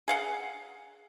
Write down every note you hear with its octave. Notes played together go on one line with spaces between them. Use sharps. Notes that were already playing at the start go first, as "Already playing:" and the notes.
G#4 F5 F#5